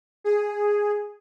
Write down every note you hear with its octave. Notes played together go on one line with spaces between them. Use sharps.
G#4